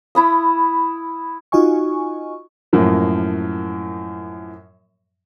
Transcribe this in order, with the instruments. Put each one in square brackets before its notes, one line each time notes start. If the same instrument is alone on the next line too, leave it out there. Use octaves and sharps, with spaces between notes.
[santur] E4 B5 D#6
[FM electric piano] D#4 F4 F#4 D#5 G#5 C#6
[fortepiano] F#2 A2 F3 A#3